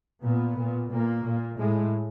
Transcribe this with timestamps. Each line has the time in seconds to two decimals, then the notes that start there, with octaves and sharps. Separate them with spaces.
0.23 A#2 B3
0.56 A#2
0.91 A#2 A#3
1.24 A#2
1.58 A2 G#3